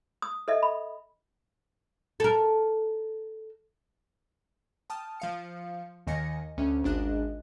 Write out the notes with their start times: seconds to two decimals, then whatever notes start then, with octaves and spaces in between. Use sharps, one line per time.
0.22 D#6
0.48 A4 D#5 E5
0.63 B5
2.20 A4 A#4
4.90 G5 A5 D#6 F6
5.20 F3 F5 C#7
6.07 D#2 D#3 D#5 G#5 A#6 C#7
6.57 D2 C#4
6.84 G#1 D4 D#5 F#6